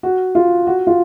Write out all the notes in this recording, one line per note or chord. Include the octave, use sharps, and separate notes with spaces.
F#4
F4
F#4
F4